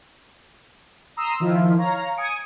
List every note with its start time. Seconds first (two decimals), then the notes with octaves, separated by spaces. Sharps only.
1.17 A#5 C6 D#6 E6
1.40 D#3 F3 E4 F4
1.77 C#5 F5 A#5
2.17 G#5 D#6 C#7 D7